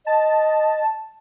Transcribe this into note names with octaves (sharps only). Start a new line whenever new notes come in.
D#5 A5